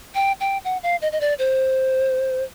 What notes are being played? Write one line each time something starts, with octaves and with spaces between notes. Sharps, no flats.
G5
G5
F#5
F5
D#5
D#5
D5
C5